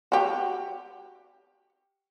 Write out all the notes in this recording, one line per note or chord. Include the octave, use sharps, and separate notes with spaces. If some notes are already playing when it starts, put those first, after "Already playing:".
F#4 G4